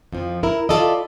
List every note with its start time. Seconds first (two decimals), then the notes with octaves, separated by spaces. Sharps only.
0.13 F2 F3
0.43 E4 A#4
0.69 E4 F4 A4 D5 D#5